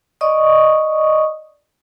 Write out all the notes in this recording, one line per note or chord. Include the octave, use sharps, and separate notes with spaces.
D5 D#5 C#6 D#6